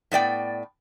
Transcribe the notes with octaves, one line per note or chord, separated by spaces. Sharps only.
A2 B3 D5 G5